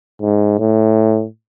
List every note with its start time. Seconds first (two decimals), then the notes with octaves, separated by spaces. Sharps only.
0.21 G#2
0.59 A2